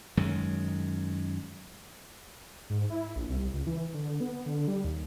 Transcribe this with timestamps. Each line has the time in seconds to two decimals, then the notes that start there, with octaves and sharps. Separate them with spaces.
0.17 F#2 D#3 G#3
2.70 G#2
2.90 E4
3.16 A#1
3.28 C2
3.54 C#2
3.67 E3
3.94 D3
4.21 B3
4.46 D3
4.68 G3
4.84 D#2